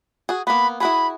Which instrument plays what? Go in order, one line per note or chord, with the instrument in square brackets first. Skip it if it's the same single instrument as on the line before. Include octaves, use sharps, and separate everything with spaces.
[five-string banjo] F#4 G#4
[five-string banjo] A#3 B3 [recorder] B5
[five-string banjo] E4 F#4 G#4 [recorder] B5